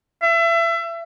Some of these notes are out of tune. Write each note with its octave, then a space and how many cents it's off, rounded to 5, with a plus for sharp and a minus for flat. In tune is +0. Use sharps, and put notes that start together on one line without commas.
E5 +30